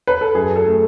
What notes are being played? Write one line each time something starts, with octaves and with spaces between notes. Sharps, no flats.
B4
A4
F#2 G#4
A4
A3